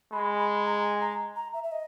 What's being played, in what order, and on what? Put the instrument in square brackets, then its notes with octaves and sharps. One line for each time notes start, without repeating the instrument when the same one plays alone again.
[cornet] G#3 [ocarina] B5
[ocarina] B5
A#5
G#5
A#5
A#5
E5
E5
D#5